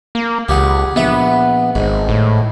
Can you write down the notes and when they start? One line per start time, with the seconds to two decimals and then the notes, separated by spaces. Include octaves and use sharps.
0.15 A#3
0.49 C#2 G4 G#4 F#5
0.96 A#1 B3 E5
1.75 G#1 G#2
2.09 A2